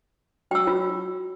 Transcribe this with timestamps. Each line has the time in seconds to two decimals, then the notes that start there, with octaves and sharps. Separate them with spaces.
0.51 F#3 G5 E6
0.67 F4